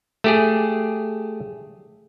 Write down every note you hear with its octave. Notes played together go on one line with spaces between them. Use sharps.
A3 G4 G#4